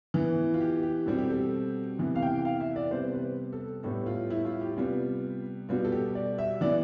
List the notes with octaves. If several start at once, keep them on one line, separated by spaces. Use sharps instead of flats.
E3 B3
F4
G4
G4
B2 G3 C4 A4
G4
A4
C3 E3 B3
F5
G5
F5
E5
D5
C3 G3 B3 C5
B4
A4
A2 G3 B3 A4
F4
E4
F4
G4
C3 G3 B3 F4
B2 G3 B3 F4
A4
G4
D5
E5
E3 B3 D5